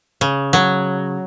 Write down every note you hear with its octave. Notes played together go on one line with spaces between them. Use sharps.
C#3
F#3